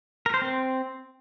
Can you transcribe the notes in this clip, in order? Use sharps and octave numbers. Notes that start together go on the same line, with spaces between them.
A#4
C5
C4